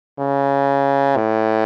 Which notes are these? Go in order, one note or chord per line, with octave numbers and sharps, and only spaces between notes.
C#3
A2